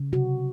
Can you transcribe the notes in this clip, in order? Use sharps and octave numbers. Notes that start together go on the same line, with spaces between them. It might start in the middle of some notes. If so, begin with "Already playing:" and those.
Already playing: C#3
C3 F#4